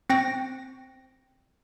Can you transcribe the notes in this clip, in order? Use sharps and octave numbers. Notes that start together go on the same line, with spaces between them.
C4 G5 A#6